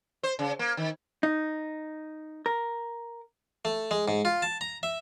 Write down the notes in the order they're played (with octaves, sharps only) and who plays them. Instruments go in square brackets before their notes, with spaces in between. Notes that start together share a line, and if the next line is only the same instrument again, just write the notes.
[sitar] C5
C#3
A#3
D#3
[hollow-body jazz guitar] D#4
A#4
[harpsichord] A3
G#3
G#2
F4
A5
A#5
E5